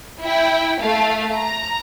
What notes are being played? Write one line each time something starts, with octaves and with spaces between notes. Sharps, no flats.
E4 G5
A3 F5
A#5